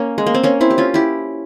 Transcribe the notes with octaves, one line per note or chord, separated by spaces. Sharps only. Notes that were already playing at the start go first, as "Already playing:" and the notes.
Already playing: A#3 C#4
G#3
A#3
C4
A#3 C#4
C4 E4
G4
C#4 F4
E4 G4